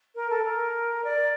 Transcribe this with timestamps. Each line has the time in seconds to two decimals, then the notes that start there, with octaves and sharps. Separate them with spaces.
0.15 A#4
0.30 A4
0.44 A#4
1.04 D5